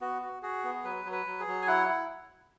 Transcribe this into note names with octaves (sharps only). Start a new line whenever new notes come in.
B3 F#4
F#4
F#4 G#4
B3
F#3 B4
F#3
B4
F#3
G#4
F#3
G#5
E4 F#5
E4